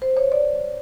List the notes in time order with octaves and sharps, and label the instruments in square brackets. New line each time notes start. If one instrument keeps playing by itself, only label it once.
[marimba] C5
C#5
D5